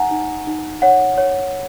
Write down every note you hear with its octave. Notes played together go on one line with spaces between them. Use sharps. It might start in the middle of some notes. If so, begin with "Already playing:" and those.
Already playing: D#4 F#5 G#5 A#5
D#4
D#4
C#5 F#5
C#5